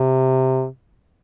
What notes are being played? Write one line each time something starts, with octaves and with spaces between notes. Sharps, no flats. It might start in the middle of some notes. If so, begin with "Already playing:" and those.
Already playing: C3